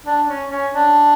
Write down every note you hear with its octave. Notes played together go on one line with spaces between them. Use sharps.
D4
C#4
C#4
D4